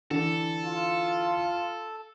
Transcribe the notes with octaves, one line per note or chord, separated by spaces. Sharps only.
D3 E3 A4
F4